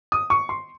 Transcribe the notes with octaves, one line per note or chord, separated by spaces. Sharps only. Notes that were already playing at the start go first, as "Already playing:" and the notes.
D#6
C#6
C6